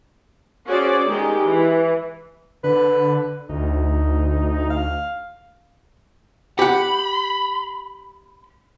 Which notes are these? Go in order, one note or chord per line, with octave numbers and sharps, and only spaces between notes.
C#4 F#4 G#4 C5 D5
D#3 G#3 G4
E3
D3 B4
D2 D#4
F5
G4 F#5 B5